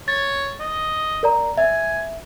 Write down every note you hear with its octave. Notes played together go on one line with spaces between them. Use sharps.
C#5 A6
D#5
A#4 D5 A#5
E5 G#5